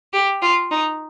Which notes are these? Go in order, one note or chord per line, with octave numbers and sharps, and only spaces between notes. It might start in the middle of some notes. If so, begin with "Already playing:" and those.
G4
F4
D#4